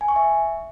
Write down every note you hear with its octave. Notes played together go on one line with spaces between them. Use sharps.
G#5
C#6
E5